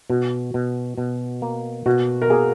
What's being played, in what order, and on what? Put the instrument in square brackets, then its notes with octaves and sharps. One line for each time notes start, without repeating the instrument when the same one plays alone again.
[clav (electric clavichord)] B2 [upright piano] F#4
[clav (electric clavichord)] B2
B2
A#3
[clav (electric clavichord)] B2 [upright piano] F#4
[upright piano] A#4
[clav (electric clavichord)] A#3 [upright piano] G#4